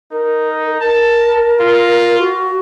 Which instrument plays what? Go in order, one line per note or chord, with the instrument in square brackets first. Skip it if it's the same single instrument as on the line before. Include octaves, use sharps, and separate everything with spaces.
[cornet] D#4 [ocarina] A#4
[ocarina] A#4 [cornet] A5
[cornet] F4
[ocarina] F#4